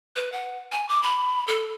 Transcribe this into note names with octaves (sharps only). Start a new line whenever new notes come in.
B4
F#5
G#5
D6
B5
A4